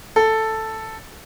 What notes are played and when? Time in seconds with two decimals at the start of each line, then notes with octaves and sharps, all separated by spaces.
0.16 A4